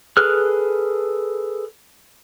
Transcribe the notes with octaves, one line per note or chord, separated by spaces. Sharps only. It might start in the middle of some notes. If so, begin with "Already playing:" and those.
G#4 A4 B4 F6 F#6